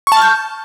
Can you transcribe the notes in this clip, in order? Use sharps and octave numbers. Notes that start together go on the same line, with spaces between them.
A5 C#6 F6 G6